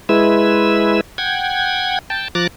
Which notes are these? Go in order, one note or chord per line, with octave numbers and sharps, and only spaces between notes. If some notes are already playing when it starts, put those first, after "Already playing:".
G#3 E4 B4 E6
F#5 G5 G#6
G5 A5
F3 A#5 D6 F#6 A6